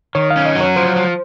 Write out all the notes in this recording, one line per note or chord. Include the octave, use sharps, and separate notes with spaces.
D#3 C#5
F5
C#4
D#5
F#3
C#5
F3 C5
F3